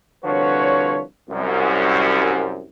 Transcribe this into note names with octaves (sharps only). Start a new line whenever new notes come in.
C2 D3 F3 F#4 B4 C#5
C2 F#2